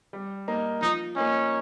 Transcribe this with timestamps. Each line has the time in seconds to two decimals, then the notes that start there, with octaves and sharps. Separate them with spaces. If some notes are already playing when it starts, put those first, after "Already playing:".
0.13 G3
0.48 A#3 D#4 A#4
0.82 F3 D#4
1.16 A#3 C#4 D#4